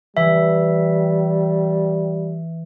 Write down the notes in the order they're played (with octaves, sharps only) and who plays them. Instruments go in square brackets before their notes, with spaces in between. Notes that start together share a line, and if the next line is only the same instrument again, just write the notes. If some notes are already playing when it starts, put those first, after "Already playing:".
[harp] E3 [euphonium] G3 [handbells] E5